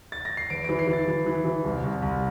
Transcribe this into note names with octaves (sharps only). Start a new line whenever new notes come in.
A6
A#6
C7
E2 D7
E3 D7
C7
E3
A6
E3
E3
E3
C2
C2
C2